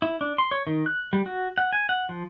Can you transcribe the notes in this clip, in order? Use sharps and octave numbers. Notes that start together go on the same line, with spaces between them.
E4
D4
C6
C#5
D#3
F#6
G3
F#4
F#5
G#5
F#5
F3